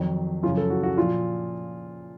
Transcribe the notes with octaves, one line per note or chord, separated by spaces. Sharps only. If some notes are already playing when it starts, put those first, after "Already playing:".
Already playing: F2 D#3 F#3
F#2 C#3 F3 F4
A4
F#4
F#4
A#2 F3 F4